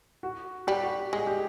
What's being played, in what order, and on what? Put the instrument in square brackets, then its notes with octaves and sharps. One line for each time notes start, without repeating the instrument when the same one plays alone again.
[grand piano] F#4
[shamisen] G3 [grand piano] G4
[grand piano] F#4
[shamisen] G#3 [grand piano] G#4
[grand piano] G4